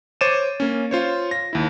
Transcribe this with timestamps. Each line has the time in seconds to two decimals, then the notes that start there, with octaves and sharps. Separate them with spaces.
0.21 C5 C#5 D6 A6 D#7 E7
0.60 A#3 C#4
0.91 F4 C5 C#5
1.31 A#6
1.53 D#2 E4